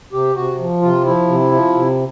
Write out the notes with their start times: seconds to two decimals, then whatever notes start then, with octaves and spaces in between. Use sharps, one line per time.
0.13 C3 G4
0.36 C3 F#4
0.59 F3
0.82 C3 F4
1.05 F3 E4
1.28 C3
1.52 F3
1.74 C3